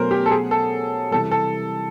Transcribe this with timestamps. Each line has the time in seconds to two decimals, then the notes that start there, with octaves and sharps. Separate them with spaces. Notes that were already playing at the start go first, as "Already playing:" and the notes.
Already playing: B2 F#3 A3 C#4 F#4 A#4 C5
0.11 G4
0.26 A4
0.31 G#4
0.51 A4
1.11 C3 E3 G3 A4
1.31 A4